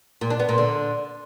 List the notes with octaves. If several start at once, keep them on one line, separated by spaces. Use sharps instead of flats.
A#2
D4
B3
A#2
D3